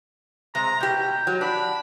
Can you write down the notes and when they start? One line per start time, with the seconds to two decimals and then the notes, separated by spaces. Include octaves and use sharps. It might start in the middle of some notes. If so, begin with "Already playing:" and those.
0.55 C3 G#3 A#5
0.81 B2 G4 G5
1.27 F#3
1.41 D4 B5